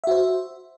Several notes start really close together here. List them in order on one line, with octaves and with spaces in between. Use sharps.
E5 F#4 C5